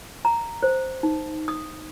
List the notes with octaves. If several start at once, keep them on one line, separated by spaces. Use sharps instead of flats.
A#5
C5
D#4
D#6